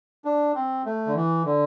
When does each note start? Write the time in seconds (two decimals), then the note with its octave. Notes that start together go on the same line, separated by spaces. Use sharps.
0.25 D4
0.55 C4
0.86 A3
1.07 D3
1.15 E3
1.45 D3